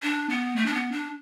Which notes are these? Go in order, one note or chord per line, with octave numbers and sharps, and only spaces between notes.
D4
B3
A3
D4
B3
D4